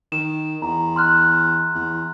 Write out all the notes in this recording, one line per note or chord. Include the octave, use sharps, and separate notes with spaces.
D#3 E7
E2 A#5
C6 F6 F#6
E2